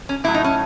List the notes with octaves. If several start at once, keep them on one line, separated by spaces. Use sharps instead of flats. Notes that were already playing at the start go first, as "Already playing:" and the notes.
C#4
A2 F#3 A3 E4
D#4
C#4